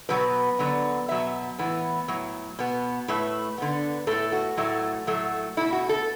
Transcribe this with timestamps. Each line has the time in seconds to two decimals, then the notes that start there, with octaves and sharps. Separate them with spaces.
0.09 B2 F#3 B3 B4
0.59 D3 F#3 B3
1.08 B2 F#3 B3 E5
1.58 A2 E3 B3
2.08 A2 F#3
2.59 B2 B3
3.08 A2 A3 B4
3.58 D3 B3
4.07 A2 A3 A4
4.32 F#4
4.57 A2 F#3 A3
5.07 A2 F#3 A3
5.57 B2 A3 E4
5.73 F#4
5.89 A4